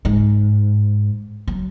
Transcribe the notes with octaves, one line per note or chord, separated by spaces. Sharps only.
G#2
F#3